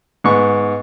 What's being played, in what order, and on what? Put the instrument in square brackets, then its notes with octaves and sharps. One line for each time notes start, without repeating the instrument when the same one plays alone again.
[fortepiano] G#2 B3 C#6